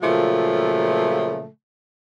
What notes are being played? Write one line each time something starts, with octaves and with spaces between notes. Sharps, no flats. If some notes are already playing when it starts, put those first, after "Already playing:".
A#2 C#3 F3 F#3 A3